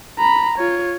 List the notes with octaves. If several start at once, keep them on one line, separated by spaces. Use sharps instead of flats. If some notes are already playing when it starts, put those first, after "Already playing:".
A#5 B5
F4 C#5